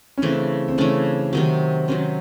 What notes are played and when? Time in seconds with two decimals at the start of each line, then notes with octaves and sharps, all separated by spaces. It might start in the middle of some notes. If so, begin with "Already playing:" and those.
0.18 C#4
0.22 C#3 E3 A3 C4 D4
0.68 C4
0.78 C#3 E3 A3 C#4 D4
1.33 C3 D#3 F#3 C4
1.88 C3 D#3 F#3 C#4